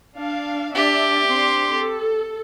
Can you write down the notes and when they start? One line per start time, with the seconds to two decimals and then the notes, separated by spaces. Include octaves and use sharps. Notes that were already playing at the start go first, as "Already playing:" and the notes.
0.17 D4 F5
0.75 D4 G4 D5 E5
1.25 C4 D4 C6
1.74 A4